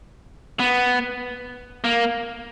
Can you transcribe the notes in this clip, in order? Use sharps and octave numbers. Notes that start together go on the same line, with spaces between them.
B3
A#3